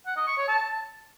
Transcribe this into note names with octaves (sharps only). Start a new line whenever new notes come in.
F#5
D#5
C#6
C#5
A5